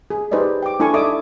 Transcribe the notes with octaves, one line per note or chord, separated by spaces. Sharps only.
G#4
D#4 G4 B4 C5 D5 D#5
G5 D6
D4 E4 A4 G#5 C#6
D#4 A4 D5 E5 D6 D#6